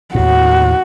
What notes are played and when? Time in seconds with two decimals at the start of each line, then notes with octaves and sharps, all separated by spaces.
0.15 D#2 A2 F#4